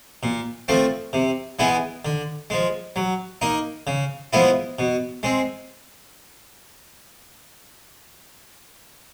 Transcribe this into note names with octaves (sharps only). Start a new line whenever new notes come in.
A#2
F3 A3 C4
C3
E3 G#3 B3 E4
D3
F3 G#3
F#3
A#3 D#4
C#3
F3 G#3 B3 E4
B2
G#3 C4